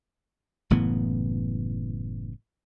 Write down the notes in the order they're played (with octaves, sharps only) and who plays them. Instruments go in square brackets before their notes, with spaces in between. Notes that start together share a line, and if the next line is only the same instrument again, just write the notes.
[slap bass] F#1 A2 E3 B3